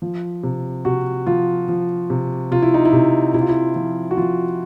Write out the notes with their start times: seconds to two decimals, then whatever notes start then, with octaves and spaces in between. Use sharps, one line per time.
0.02 F3
0.43 C3
0.85 C3 F#4
1.27 F3 F4
1.68 F3
2.10 C3
2.51 C3 F4
2.62 E4
2.74 D#4
2.85 E4
2.93 C3
3.34 C3 E4
3.41 F4
3.49 E4
3.76 F3
4.11 F#4
4.17 F3 F4